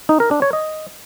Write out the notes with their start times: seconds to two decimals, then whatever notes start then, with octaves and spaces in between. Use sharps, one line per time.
0.09 D#4
0.20 A#4
0.31 D4
0.42 C#5
0.53 D#5